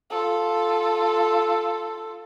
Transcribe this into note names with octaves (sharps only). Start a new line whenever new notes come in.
F4 A4